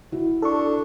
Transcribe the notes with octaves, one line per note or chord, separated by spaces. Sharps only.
E4 F#4
D4 A4 C#6